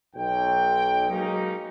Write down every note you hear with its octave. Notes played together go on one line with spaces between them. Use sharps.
B1 G5
F#3 G#3 A#3 C#4 D#4